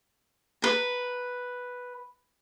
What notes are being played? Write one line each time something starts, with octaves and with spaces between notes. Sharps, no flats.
B4 A#5